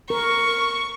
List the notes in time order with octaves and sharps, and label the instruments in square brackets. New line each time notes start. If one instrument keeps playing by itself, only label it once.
[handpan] A#4 [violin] C#6